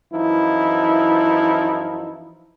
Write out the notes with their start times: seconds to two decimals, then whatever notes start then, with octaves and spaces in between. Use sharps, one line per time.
0.13 F#2 E3 F3 D#4 E4